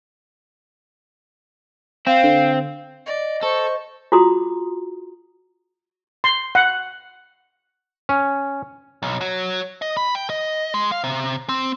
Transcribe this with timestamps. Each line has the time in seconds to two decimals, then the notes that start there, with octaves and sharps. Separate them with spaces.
2.07 C4 F5
2.24 D3
3.06 D5 D#5
3.43 A4 C5 C#6
4.12 F4 F#4 G#4 A#5 C6 D#6
6.24 C6
6.55 F#5
8.09 C#4
9.03 B1
9.21 F#3
9.82 D#5
9.97 B5
10.15 G5
10.30 D#5
10.74 G#3
10.92 F5
11.04 C3
11.49 C4